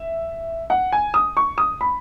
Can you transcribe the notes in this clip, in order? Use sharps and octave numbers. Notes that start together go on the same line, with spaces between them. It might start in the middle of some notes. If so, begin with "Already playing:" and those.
Already playing: E5
F#5
G#5
D#6
C#6
D#6
B5